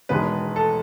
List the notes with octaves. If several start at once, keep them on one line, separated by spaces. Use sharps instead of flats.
E1 E2 D#3 G#3 B3 B4
A4